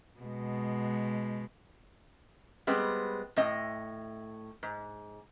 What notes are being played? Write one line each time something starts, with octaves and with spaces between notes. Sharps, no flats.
B2 G#3
G3 G#3 B3 C4
A2 C4 D#5
G#2